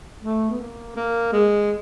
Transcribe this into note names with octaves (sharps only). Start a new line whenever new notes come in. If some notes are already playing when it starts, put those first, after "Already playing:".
A3
B3
A#3
A#3
G#3